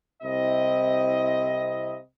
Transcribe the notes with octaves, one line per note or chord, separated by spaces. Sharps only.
C2 C3 C4 E4 D#5